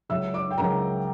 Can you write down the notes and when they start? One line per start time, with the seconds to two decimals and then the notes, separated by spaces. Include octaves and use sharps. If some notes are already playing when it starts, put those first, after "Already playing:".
0.09 C#2 C#3 F#3 E5 E6
0.33 D5 D6
0.51 G5
0.58 C#2 C#3 F#3 A#4 A#5